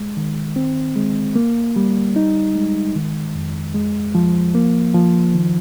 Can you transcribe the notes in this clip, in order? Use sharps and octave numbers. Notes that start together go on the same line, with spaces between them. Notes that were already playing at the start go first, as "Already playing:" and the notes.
Already playing: G#3
D#3
C4
G#3
A#3
G3
D#4
G#3
D#3
F2
G#3
F3
A#3
F3
D#3